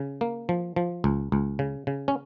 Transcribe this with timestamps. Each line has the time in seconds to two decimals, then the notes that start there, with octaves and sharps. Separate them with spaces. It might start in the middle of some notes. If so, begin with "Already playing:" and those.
Already playing: C#3
0.21 A#3
0.49 F3
0.76 F3
1.04 C#2
1.32 C#2
1.59 C#3
1.87 C#3
2.08 C#4